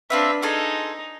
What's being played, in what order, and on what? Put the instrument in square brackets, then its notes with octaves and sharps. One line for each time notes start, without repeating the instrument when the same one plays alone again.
[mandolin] C4 F4 E5 [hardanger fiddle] D4 B4
[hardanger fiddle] D#4 [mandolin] F4 G#4 A4